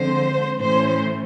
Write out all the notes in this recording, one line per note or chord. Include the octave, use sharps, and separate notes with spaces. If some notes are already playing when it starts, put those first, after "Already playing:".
Already playing: D3 F3 G#3 C4 C5
A2 E3 A3 C#4 C5